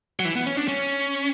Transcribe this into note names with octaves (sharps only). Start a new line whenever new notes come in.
F#3
E3
B3
C#4
D4
C#4